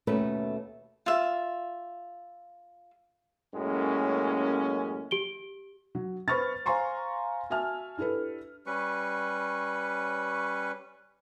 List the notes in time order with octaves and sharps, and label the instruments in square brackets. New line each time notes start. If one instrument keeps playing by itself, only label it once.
[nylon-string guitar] D#2 B2 A3 C#4 B4 E5
[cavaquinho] F4 E5
[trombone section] F#2 A2 G#3 [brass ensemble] A#3 C#4
[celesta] G4 D7 G7
[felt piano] F#3
B4 C5 B5 C#6 F6 A6
C5 F5 G#5 A#5 C6 C#6
F#4 E5 G#5 A5 F6
D4 E4 G4 A4 B4
[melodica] G3 C#4 B4 C#6